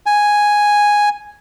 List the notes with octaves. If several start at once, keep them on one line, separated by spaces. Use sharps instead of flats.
G#5